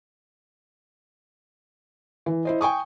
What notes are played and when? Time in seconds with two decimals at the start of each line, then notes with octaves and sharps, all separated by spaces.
2.26 E3
2.45 E4 C5 D#5
2.61 G5 G#5 C#6 D#6